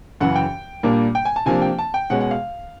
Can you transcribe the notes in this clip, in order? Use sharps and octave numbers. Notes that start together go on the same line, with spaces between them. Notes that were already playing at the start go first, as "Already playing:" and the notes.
F#2 C#3 E3 F#5
G5
A#2 G3 A#3 D4
G5
G#5
A5
C3 F3 A#3 D4 G#5
G5
A5
G5
B2 G#3 C#4 F#5
F#5
F5